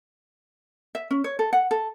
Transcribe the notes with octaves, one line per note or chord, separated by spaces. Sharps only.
E5
C#4
C#5
A4
F#5
A4